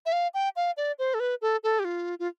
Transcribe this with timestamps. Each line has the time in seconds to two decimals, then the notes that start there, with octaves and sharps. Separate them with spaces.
0.06 E5
0.12 F5
0.34 G5
0.56 F5
0.77 D5
0.99 C5
1.14 A4
1.20 B4
1.42 A4
1.63 A4
1.79 G4
1.85 F4
2.19 F4